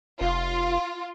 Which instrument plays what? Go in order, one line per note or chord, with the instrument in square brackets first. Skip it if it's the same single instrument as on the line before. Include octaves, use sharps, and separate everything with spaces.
[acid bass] F1 [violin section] F4